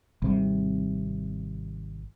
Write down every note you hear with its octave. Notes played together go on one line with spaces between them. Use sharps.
G#1 C3 G3